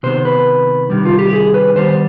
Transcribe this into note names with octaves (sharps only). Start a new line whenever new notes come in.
C3 D#3 B3 C5
B4
C3 D#3 G3
F4
G4
G#4
B4
D#3 G3 B3 C5